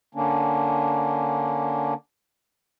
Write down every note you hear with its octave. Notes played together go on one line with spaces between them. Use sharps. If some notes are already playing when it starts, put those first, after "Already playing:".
D3 A#3 C#4 D4